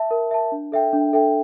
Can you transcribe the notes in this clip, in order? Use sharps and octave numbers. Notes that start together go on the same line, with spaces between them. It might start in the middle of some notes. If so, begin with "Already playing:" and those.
Already playing: E5 A5
A#4
E5 A5
D4
A4 E5 G5
D4
A4 E5 G5